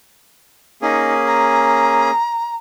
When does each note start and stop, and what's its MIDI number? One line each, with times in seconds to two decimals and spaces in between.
0.82 2.11 58
0.82 2.11 61
0.82 1.13 63
0.82 2.11 68
1.27 2.56 82